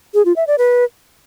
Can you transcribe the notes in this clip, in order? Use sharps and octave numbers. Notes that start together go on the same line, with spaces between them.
G#4
F4
E5
D5
B4